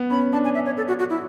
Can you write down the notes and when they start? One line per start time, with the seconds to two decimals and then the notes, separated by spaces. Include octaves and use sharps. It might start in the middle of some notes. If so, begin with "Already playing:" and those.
Already playing: B3
0.10 C#4 B5
0.33 D4 A5
0.44 G#5
0.54 E5
0.66 C#5
0.77 A4
0.88 F#4
0.99 F#4
1.10 E4